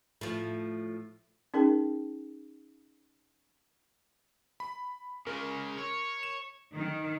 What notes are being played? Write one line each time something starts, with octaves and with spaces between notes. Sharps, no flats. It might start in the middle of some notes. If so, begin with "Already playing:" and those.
A2 F3
C#4 D#4 G#4 A#4 G5 A5
B5
C#3 G#3 A#4
C#5
E7
D#3